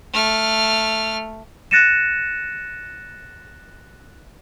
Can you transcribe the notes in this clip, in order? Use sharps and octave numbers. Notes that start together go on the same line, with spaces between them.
A3 F6
F#6 A6 A#6 C#7 D#7 E7